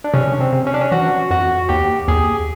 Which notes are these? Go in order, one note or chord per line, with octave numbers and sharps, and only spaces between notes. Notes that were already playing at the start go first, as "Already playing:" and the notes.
D4
C3 C#4
C4
C3
C#4
D4
C#4
E3 F#4
F2 F#4
D#2 G4
D#2 G#4